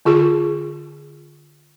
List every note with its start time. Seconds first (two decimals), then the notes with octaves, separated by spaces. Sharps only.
0.05 D3 F4 G#4 C#6